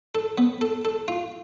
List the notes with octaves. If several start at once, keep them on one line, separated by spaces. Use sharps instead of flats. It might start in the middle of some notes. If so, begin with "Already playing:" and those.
A4
B3
A4
A4
F4